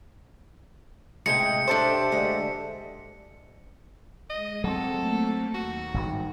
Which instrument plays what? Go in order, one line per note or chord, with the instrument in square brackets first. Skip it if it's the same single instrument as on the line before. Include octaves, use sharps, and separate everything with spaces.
[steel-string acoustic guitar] A2 C3 G5 [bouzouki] G#3 [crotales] C#7
[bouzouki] D4 A4 C5 [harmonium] G4 E5
[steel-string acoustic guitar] D2 G#3
[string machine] G#3 [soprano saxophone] D#5
[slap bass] F#3 C4 [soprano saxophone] A4
[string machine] A3 A#3
[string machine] D#2 A#5 [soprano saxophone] F#4
[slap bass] G#1 G2 D#3